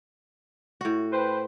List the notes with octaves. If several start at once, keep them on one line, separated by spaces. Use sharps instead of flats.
A2 F#4
B4 C5 G5